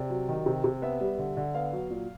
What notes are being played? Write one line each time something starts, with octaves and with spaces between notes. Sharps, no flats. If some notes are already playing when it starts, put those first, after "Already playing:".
Already playing: C3 D5
F#3
D#3
C3
C3
B3 E5
G3
D3
D3
B3 F5
F#3
A#2